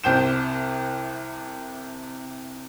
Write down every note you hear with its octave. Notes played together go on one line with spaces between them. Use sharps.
C2 C3 G5 G6 E7